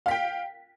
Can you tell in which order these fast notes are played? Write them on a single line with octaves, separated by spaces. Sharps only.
F5 B6 G5